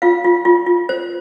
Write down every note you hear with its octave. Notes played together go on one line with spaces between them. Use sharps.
F4 F5
F4
F4
F4
C5